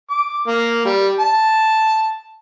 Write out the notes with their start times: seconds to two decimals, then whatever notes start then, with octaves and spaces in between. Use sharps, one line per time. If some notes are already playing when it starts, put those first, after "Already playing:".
0.11 D6
0.48 A#3
0.86 G3
1.20 A5